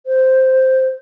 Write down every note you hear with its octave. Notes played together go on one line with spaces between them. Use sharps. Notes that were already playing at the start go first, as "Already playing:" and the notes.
C5